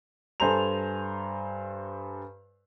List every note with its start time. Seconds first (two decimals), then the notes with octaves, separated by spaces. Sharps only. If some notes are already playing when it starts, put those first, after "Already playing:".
0.40 G2 A4 C5 G#5 A#5 F7